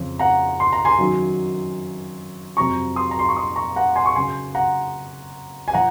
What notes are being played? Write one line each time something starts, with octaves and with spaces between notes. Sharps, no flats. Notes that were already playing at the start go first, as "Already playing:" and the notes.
Already playing: F2 C#3 F3
F#5 A#5
C6
A#5
G#5 C6
F#2 D#3 F#3
F2 C3 F#3 A#5 C#6
C6 D#6
A#5
C6
C#6
C6 D#6
A#5 C#6
F#5 A#5
G#5 C6
C#6
F#2 C#3 F#3 G#5 C6
F#5 A#5
G#5
F3 F#5 A#5